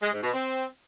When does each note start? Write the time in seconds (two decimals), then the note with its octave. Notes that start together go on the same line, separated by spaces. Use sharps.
0.03 G#3
0.13 G#2
0.23 B2
0.33 C4